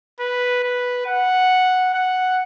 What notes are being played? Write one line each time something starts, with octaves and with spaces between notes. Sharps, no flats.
B4
B4
F#5
F#5